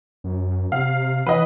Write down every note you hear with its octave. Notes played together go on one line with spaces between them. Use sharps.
F#2
C3 F5
E3 B4 D#5